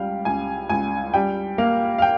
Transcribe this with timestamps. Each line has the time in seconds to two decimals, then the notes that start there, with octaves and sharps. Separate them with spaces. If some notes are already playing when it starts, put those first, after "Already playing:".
Already playing: C#2 G3 F5 G5
0.25 C#2 G#5
0.69 C#2 G#5
1.14 G3 G5
1.58 A#3 F5
1.98 F5
2.02 G5